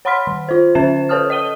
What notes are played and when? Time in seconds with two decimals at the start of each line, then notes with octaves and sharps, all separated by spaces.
0.05 C#5 F#5 B5 C6 F6 B6
0.27 D#3
0.49 F4 C5
0.75 D3 C#4 C5 E5 A6 E7
1.09 A4 B4 C#5 A5 D#6 F6
1.30 D#5 D#6 D#7 G7